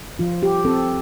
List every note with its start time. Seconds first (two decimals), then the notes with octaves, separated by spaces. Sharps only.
0.19 F3 F4
0.43 G4
0.65 C4 A4